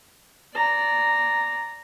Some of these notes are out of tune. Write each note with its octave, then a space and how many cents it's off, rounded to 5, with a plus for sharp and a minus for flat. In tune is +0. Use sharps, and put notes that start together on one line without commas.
D5 -10 A#5 -5